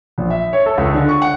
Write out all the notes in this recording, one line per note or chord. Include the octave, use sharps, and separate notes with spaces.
A#1
E5
C#5
A4
C#2
D3
C#6
F#5